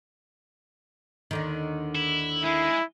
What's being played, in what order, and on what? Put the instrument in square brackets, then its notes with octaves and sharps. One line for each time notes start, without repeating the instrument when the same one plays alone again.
[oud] D#2 D3 D#3
[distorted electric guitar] E4
[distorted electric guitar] G#3 [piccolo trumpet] E4